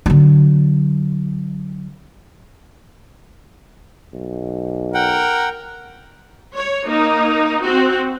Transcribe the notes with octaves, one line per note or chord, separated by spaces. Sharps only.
D3 F#3
B1
A#4 F#5 G5
C#5
A#3 D#4
C4 F#4